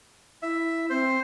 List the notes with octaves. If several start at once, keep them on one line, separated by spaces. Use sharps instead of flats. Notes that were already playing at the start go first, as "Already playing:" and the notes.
E4 E5
C4 C5